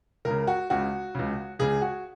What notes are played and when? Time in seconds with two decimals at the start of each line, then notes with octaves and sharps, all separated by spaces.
0.25 C#2 A#4
0.30 C#3
0.47 F#4
0.70 C#2 C#3 F#4
1.15 C#2 C#3
1.59 C#2 C#3 G#4
1.82 F#4